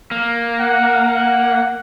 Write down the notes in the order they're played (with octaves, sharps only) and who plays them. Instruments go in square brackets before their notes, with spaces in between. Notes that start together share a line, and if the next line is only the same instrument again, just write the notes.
[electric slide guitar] A#3
[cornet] F#5